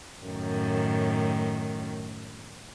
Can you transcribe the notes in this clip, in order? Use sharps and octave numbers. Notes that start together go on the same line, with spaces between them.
F#2 A2 D#3